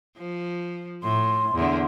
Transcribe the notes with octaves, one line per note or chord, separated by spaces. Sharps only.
F3
A2 C6
E2 D3